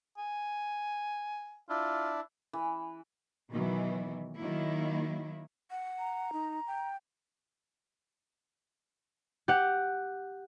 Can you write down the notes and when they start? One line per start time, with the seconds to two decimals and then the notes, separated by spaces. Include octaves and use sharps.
0.18 G#5
1.69 D4 E4 F4
2.53 E3
3.50 B2 D#3 E3 F#3
4.36 D#3 F#3 A#3 E4
5.71 F#5
5.99 A#5
6.33 D#4
6.67 G5
9.48 G4 F#5